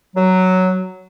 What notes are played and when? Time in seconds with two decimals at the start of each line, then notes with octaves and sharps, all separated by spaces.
0.16 F#3